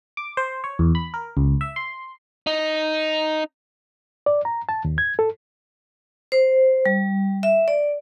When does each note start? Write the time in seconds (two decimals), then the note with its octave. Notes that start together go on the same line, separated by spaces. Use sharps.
0.17 D6
0.37 C5
0.64 C#5
0.79 E2
0.95 B5
1.14 A#4
1.37 C#2
1.61 E5
1.76 C6
2.47 D#4
4.26 D5
4.45 A#5
4.69 A5
4.85 D#2
4.98 G#6
5.19 A4
6.32 C5
6.86 G3
7.43 E5
7.68 D5